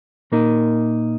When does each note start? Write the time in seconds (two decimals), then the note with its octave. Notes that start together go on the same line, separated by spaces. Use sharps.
0.32 A#2 A#3 D#4 A#4